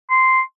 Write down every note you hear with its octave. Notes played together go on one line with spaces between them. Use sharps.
C6